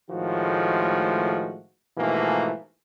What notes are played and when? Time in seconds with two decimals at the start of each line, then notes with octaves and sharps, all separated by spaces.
0.10 A2 D#3 F3 G#3 A3 F#4
1.98 G#2 B2 E3 F3 A3 A#3